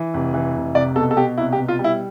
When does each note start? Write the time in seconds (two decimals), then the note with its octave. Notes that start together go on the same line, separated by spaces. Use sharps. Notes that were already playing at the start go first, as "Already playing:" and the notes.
Already playing: E3
0.14 F1
0.34 E3
0.55 F1
0.75 C2 D5
0.96 B2 A4
1.11 A4
1.17 B2 G4
1.38 C2 E4
1.53 G4
1.58 B2
1.68 F4
1.79 G3
1.84 E4